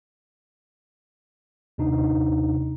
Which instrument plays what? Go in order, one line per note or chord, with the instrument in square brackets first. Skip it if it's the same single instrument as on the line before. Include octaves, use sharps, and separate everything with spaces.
[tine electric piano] D#2 C3 D4 D#4